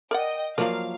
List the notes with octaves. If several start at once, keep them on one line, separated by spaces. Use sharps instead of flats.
A#4 D5 D#5 F#5 G5
F3 F#3 A#3 A#4 D5 F5